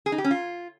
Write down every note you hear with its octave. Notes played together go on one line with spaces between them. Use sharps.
G#4
D#4
G4
C#4
F4